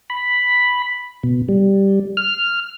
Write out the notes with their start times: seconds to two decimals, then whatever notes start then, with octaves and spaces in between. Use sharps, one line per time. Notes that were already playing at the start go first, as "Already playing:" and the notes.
0.10 B5
1.23 B2
1.49 G3
2.17 F6